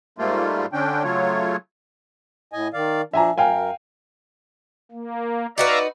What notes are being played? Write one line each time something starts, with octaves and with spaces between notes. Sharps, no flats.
G#2 G3 A3 A#3 F4
D3 C#4 D4 G5
C#3 F#3 A3 F4 C#5
A2 D#5 G#5
D#3 D5 F5
F3 D4 E5 G#5 A#5
F#2 A#4 F5 G5 G#5
A#3
D#4 F#4 B4 D5 E5 F5 A#5